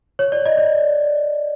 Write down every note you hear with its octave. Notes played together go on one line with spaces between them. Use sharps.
C#5
D5
D#5
D5